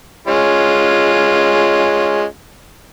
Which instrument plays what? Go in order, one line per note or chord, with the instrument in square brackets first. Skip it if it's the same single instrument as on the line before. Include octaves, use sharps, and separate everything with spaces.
[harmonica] G#3 C#4 F4